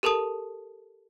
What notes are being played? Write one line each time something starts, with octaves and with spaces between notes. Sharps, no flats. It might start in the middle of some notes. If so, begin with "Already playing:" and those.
G4 A4 A#4 A5 D#6